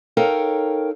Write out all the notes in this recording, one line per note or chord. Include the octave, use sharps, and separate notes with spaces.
D#4 A4 A#4 C#5 F5 G5